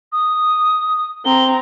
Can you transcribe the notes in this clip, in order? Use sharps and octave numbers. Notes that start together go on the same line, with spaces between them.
D#6
C4 A#5 G7